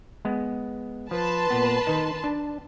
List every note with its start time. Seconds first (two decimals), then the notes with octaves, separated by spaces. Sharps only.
0.25 G#3 B3
1.11 F3 B4 A5 C6
1.50 A#2 B3
1.87 D#3 D#4
2.24 D4